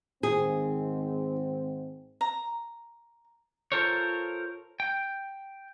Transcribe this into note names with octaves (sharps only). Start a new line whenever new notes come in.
G#2 D#3 C4 G#4
A#5
F4 A4 A#4 C5 C#5
G5